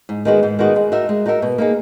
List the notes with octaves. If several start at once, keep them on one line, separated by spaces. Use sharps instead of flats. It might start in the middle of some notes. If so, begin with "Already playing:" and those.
G#2
D#3 G#3 B3 F#4
G#2
D#3 G#3 B3 F#4
G#3
D#4 F#4 A#4 E5
G#3
D#4 F#4 A#4 E5
B2
A#3 D#4 G#4